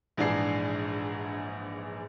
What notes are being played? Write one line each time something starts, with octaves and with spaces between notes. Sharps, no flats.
A#1 G#2 E3 D4 G#4 C7